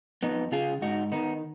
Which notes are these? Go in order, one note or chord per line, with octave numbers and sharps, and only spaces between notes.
F2 B3 D#4
C#3 F4 G#4
G#2 D#4 F#4
D#3 B3 D#4